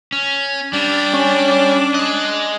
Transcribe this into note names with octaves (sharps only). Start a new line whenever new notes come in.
C#4
G3 D4
C#4
G#4 D#5 F#6